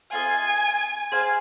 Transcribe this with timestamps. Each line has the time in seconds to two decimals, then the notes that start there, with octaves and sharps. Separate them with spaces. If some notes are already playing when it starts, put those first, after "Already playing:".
0.12 C4 F4 B4 D#5 G#5
1.12 G#4 C5 F5 G#5